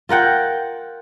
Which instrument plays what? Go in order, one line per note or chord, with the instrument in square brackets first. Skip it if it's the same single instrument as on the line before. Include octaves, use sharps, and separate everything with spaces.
[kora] F4 A#4 F#5 G5